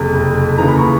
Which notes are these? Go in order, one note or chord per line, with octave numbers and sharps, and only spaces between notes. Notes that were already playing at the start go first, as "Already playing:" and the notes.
Already playing: F#1 F2 C3
D#2 C#3 E3 A#5
B5
C#6